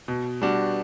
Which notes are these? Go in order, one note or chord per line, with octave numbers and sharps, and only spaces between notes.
B2
G3 D4 F#4